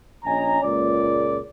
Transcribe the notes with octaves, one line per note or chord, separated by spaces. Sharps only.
A#1 C#4 D#5 G#5 A#5
C#2 A#2 D5